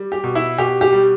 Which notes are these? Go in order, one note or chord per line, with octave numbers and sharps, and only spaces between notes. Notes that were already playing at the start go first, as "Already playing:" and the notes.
Already playing: G3
G4
B2
E4
B2 G4
G4
G3